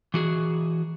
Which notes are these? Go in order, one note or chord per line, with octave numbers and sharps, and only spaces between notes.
E3 F#4 G#4